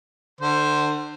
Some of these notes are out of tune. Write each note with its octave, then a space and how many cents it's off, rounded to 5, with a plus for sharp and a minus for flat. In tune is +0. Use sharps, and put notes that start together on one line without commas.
D3 +30 C5 +0